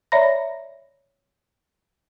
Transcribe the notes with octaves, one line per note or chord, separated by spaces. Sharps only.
C#5 D5 E5 A#5 B5 A#6